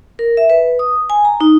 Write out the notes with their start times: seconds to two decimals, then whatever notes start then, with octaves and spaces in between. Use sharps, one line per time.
0.19 A#4
0.37 E5
0.50 B4
0.79 D#6
1.10 G#5
1.25 A#5
1.41 D#4